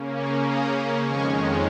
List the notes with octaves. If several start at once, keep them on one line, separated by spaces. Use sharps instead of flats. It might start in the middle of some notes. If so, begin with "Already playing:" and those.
Already playing: C#3 A#3 C#4
G#5 C#6
A#5 D#6
F2 D#3 G#3 C#4 G#5 C#6